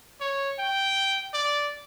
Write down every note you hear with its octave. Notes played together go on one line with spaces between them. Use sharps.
C#5
G5
D5